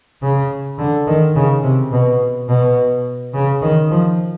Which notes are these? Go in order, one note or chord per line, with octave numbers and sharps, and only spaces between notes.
C#3
D3
D#3
C#3
C3
B2
B2
C#3
D#3
F3